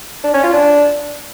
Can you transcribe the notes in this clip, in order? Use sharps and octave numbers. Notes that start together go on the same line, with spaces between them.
D4
C#4
F4
D4